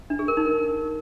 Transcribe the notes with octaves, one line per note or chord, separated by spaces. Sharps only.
D4
G#4
A#4
D#4
A#4